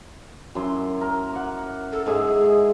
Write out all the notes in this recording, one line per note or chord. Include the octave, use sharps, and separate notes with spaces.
F#2 E4 C6
A#4
F#5 D6
A4
G#2 G#3 G#4 E5